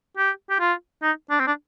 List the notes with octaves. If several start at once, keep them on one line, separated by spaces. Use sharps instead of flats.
G4
G4
F4
D#4
D4
C4
D4